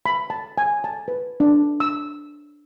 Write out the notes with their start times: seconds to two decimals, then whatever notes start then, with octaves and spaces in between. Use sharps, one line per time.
0.06 B5
0.30 A5
0.58 G#5
0.84 A5
1.08 B4
1.40 D4
1.80 E6